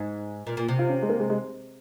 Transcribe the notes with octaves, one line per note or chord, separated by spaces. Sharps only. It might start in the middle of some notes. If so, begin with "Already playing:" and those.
Already playing: G#2
A#2
A#2
C3
F4
C#4
G#3
A#3
G#3
G#3